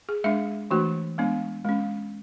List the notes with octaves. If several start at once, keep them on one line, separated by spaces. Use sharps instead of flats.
G#4
G#3 D4 E5
E3 A3 D4 F#4
G#3 B3 D4
G#3 C#4